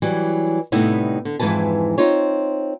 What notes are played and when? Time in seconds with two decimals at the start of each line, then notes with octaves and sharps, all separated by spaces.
0.02 E3 F#3 G3
0.72 A2 C3 G3 B3 D#4 E4
1.25 D3
1.40 F2 G#2 E3 E4 B4 A5
1.98 C4 D#4 F4 C#5